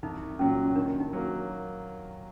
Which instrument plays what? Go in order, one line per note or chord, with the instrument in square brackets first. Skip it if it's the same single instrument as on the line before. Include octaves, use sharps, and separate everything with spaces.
[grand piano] C2 [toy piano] D#4
[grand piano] A#2 F#3 [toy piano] C#4
[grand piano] D#3 [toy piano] D4
[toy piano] D#4
[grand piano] F#3 A#3